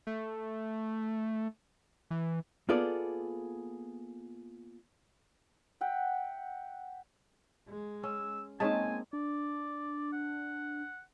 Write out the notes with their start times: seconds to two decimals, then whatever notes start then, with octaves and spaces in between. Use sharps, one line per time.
0.07 A3
2.11 E3
2.69 A#3 B3 F4 G#4 A4 D5
5.81 E5 F#5 G5
7.68 G#3
8.03 C#4 E6
8.60 G#3 A#3 C4 D#4 C#5 G#5 A5
9.13 D4 D5
10.13 F#5